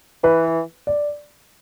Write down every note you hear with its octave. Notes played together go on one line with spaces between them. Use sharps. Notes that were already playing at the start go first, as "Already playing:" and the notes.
E3 B4
D5